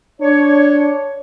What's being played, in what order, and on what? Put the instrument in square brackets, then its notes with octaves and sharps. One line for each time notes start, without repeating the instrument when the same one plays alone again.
[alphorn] D4 [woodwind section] C#5